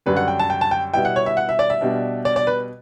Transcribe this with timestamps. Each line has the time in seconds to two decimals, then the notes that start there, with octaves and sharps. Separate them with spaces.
0.06 F#2 D3 G3 C#4 B4
0.17 F#5
0.28 G5
0.39 A5
0.50 G5
0.61 A5
0.71 G5
0.94 B2 G3 B3 E4 G5
1.05 F#5
1.16 C#5
1.26 E5
1.37 F#5
1.49 E5
1.59 D5
1.70 E5
1.81 B2 G3 D4
2.25 D5
2.36 D5
2.47 B4